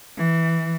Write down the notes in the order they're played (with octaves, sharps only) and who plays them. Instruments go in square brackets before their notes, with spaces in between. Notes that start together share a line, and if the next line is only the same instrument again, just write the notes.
[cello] E3